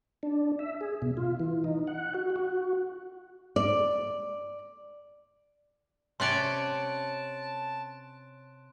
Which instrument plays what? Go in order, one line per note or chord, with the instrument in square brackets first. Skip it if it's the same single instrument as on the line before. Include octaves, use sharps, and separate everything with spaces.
[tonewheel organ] D4
E5
G#4
B2
F4
E3
D#4
F#5
F#4
F#4
[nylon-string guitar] D5
[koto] C3 C#5 D5 [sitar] C#4 [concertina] A5 [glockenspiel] C6 F#6 D7